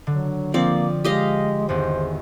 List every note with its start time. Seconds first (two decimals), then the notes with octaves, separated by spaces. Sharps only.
0.07 D3 F#3
0.54 F3 A#3 C4 D5
1.04 G#3 G4 D#5 F5
1.69 G#1 E2 B3 C5